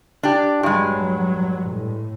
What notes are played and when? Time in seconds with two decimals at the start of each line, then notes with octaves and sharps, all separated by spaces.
0.23 D4 G4
0.63 G2 F#3 G#3
1.69 A2